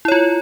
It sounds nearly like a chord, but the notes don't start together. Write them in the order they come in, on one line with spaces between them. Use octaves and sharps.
E4 C#5 F4